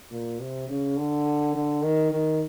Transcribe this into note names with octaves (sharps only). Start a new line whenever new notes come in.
A#2
C3
C#3
D3
D3
D#3
D#3